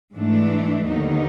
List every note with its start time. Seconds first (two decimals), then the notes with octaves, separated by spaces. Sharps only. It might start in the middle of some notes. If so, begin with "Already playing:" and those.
0.14 G#2 E3 A3 D4
0.87 D#2 D3 F#3 B3 D#4